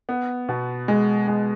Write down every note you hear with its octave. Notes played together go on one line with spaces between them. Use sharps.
B3
B2
G#3
G#3